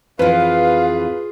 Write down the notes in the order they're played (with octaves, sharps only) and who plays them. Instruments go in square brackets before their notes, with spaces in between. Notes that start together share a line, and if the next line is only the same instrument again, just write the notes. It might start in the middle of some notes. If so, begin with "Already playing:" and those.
[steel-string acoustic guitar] F2 E3 [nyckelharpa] F4 G#4 [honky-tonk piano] B4 [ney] F5